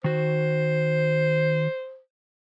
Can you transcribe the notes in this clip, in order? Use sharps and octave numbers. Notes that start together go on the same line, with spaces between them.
D#3 F#4 C5